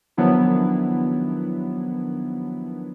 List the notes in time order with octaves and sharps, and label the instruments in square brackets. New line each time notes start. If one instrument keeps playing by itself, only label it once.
[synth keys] D#3 F3 F#3 B3 D4 E4